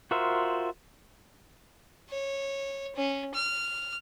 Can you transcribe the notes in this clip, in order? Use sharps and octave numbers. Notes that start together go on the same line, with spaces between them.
F4 F#4 A#4 C5 E5
C#5
C#4
F6